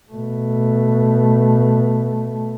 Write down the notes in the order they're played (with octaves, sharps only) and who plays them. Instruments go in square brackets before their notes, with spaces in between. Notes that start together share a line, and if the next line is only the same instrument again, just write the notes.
[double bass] B2 A3